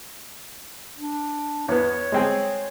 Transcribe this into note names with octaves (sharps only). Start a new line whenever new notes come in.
D4
E2 B3 C#5
G#3 C4 G#4